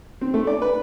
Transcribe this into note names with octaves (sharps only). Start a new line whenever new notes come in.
C4
A3
D5
B4